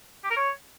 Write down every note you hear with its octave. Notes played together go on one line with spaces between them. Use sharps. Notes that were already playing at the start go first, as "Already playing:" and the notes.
G4
A#4
C#5